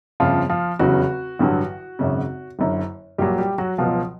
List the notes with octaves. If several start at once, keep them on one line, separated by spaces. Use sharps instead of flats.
G1 F2 C#3 F3 F4
F3 F4
F1 E2 C#3 F#3 F#4
A1 G2 D3 F#3
G#1 F#2 C#3
F#1 F#2 D3
A#1 A#2 F#3 G3 G4
G3 G4
F#3 F#4
C#2 B2 F3 F#3 F4